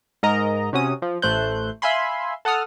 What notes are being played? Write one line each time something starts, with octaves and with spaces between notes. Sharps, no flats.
G#2 A#4 D#5 A#5
C3 C#4 F#4 D#6
F3
A1 A3 C5 F#6 G6
E5 F5 G#5 B5 C6
A4 F#5 A5 D#6 F6